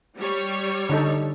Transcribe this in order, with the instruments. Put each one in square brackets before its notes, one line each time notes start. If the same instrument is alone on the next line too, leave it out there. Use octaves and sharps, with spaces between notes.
[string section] G3 C#5
[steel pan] D3 D#4 A4